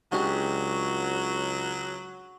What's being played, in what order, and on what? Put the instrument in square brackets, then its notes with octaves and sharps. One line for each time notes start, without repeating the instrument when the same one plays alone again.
[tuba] C#2 [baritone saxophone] F#3 [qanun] G#3 D4 G4 [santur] F#4